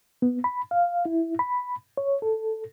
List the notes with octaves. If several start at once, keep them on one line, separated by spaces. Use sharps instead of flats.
B3
B5
F5
E4
B5
C#5
A4